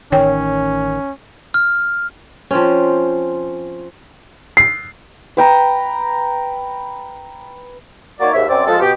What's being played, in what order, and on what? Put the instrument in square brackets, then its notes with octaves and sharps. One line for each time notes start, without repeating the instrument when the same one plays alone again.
[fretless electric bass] A1 D#3 [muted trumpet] C#4 [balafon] C#5 G5
[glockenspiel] F6
[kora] F3 C4 C#4
[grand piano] C7
[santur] B4 G5 A#5
[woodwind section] A#3 D#4 F#4 C#5 D5
D#2 G#2 E5
F#2 C4 D5
F3 G#3 A4
B2 G4